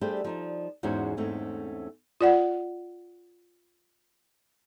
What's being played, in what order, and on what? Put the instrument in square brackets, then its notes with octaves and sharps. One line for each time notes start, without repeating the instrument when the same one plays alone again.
[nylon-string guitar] G3 A3 D4 G4 G#4 C5
F3 D#4 D5
E2 G#2 C#4 F#4 G#4 C5
E2 G#2 A3 C4 C#4
[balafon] F4 D5 F#5